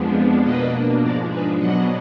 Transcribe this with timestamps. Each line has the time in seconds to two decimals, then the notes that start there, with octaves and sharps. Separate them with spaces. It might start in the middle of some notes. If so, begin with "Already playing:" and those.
Already playing: F2 F3 G#3 B3 D4
0.42 B2 A#3 D4 B4 D#5
1.01 G#2 F3 G#3 D4 A#4 D5
1.30 G#4 B4
1.58 B2 F#3 B3 D4 D#5 F#5